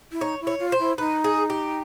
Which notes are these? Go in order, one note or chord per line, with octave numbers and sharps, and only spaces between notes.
E4
D#4 C#5
E4
C#5
F4
C5
E4
D#4 B4
G#4
G4